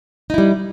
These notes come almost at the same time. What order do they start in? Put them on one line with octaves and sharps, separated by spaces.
D#4 E4 G3